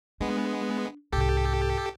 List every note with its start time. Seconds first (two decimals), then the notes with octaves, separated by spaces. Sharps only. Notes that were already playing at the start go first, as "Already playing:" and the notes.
0.21 G#3 B3 D4
1.13 C2 G#2 G4 A4